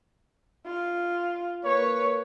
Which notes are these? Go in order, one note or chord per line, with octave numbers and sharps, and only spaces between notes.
F4
A#3 B4 C#5